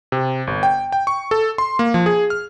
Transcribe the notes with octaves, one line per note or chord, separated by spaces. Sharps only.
C3
G1
G5
G5
C#6
A4
C6
A#3
F3
G#4
F6